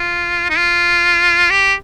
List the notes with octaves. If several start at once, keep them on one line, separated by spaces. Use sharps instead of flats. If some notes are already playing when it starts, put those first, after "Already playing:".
Already playing: F4
D#4
F4
G4